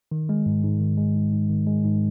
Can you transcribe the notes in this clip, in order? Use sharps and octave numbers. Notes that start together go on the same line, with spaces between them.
D#3
G#3
G#2
G#2
D#3
G#3
G#2
G#2
D#3
G#3
G#2